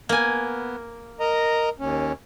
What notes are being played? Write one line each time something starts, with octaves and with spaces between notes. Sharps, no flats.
A#3 B3 G#5
A#4 D#5 A#5
D#2 C#4